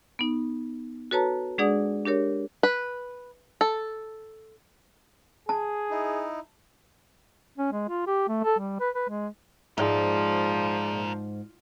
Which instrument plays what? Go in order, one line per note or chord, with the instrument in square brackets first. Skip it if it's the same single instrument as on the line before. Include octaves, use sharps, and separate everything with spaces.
[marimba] B3 D#4
F#4 A4 B4 C#5 A5 A#5
G#3 D4 G#4 D5 F#5 D#6
D4 G4 A#4 C#5
[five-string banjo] B4
A4
[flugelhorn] G#4 [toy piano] A5
[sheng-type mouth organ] D#4 E4
[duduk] C#4
G#3
F4
G4
A3
A4
G3
B4
B4
G#3
[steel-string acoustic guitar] G#2 [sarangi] F3 [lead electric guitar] F4 A#4 [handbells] G#4 D5 E5